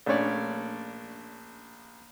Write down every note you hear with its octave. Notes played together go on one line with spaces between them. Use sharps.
A#1 A3 C#4 D4 C#5 D5